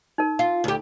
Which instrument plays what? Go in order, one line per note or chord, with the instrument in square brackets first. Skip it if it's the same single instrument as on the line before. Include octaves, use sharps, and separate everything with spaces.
[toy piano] D#4 A#4
[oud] F4
D2 G4